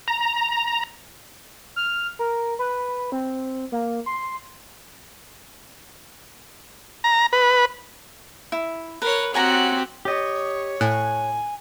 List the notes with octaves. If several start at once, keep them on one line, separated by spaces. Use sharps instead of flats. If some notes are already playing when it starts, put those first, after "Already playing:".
A#5
F6
A#4
B4
C4
A#3
C6
A#5
B4
E4
A#4 B4 C#5
C4 F#4 G4 C#5 F#5 G#5 A#5
G4 C#5 D#5
A2 G#5 F#6